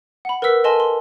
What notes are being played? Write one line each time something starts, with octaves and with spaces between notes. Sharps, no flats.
F#5 B5
A#4 B4 F#5 E6 B6
A4 A#4 D#5 G#5 A5 C6
C6